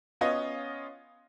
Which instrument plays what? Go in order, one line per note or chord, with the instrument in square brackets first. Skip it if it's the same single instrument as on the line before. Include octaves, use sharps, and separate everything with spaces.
[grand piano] B3 C#4 F4 C#5 D#5